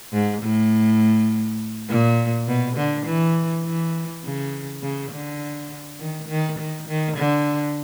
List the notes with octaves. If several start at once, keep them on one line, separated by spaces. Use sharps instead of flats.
G#2
A2
A#2
B2
D3
E3
E3
C#3
C#3
D3
D#3
D#3
D#3
D#3
D3